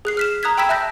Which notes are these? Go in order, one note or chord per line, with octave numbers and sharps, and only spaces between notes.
G#4 F#6 C7
F6 B6 E7
A#5 D#6 F#6 G#6 B6
G5 B5 E6 G#6 B6 E7
E5 A5 F#6 G6 A#6